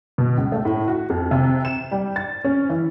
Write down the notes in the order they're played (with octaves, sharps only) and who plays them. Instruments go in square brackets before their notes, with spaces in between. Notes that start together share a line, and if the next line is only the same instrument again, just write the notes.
[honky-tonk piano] B2
C#2
A3
A2
F#4
F2
C3
E7
G3
A6
C#4
E3